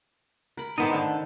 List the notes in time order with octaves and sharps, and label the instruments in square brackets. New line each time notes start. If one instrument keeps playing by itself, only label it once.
[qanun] A#4 B5
[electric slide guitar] A2 B3 D#4 [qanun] D#3 C5 A5
[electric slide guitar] D3